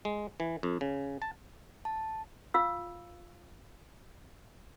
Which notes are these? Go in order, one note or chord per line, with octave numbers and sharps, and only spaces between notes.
G#3
E3
F2
C#3
A5
A5
F4 F5 E6